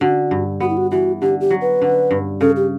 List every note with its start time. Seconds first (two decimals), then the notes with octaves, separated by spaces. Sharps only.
0.01 D3 F#4
0.31 G2
0.60 B3 F#4
0.69 E4
0.77 F#4
0.91 E3 F#4
1.21 D3 G4
1.41 G4
1.51 F#3
1.61 B4
1.82 D3
2.11 G2
2.41 C#3 A4
2.56 G4